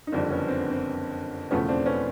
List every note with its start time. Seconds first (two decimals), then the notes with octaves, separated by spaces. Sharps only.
0.07 D#4
0.12 F#1 F2 D3 G3 C4 D4
0.30 B3 C#4
0.48 C4
0.59 B3
0.70 C4
1.51 E1 E2 C#3 F3 A3 B3 C#4
1.69 C4 D4
1.86 B3 C#4